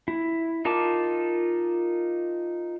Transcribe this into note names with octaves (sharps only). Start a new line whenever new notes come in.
E4
D#4 F4 A#4 A5 D6